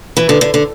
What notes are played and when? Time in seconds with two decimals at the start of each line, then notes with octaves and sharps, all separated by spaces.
0.17 E3
0.29 D3
0.41 D3
0.54 D3